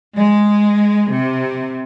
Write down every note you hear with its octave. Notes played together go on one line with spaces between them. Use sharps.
G#3
C3